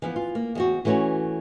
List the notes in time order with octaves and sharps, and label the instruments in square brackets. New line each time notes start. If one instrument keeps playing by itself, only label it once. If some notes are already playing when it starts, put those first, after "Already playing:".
[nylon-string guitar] E3 F3 B3
F4
A#3
E2 C4 F#4
E3 A3 C#4 F#4 C#5